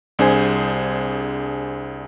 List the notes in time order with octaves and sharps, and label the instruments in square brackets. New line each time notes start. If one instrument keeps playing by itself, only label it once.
[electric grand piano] C2 D4 G#4 C5 G#5